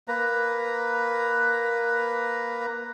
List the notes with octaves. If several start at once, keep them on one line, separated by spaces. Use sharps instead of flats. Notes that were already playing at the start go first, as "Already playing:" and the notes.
A#3 B4 A#5